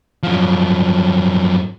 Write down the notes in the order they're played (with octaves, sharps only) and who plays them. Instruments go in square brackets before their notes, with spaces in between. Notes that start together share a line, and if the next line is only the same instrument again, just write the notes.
[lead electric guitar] F#2 F3